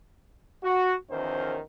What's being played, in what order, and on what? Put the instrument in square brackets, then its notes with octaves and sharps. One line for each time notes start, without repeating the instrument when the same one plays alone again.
[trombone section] F#4
E2 D#3 F3 C#4 A#4 C5